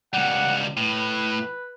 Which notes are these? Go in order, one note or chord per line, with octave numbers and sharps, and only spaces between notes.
C#2 G3 F#5
A2 B4